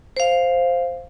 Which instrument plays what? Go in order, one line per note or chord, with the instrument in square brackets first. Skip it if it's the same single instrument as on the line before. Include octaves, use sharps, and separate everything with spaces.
[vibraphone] C5 F5